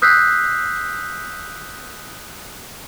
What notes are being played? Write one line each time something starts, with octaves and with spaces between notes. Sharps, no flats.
D#6 E6 F#6 G6 B6 C7